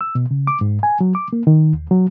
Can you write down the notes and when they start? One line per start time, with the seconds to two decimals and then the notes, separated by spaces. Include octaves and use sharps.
0.01 E6
0.15 B2
0.31 C#3
0.47 D6
0.61 G#2
0.83 G#5
1.01 F#3
1.15 D6
1.33 A#3
1.47 D#3
1.73 D#2
1.91 F#3